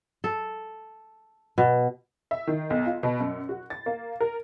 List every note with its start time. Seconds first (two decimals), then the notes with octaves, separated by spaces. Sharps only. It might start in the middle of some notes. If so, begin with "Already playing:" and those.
0.24 A4
1.58 B2
2.31 E5
2.47 D#3
2.70 B1
2.86 F4
3.03 B2
3.20 F#2
3.49 F#4
3.70 A6
3.86 A#3
4.20 A#4